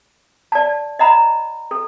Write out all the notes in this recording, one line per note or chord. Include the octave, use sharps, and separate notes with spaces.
D5 A5
D#5 F#5 A#5 B5
A4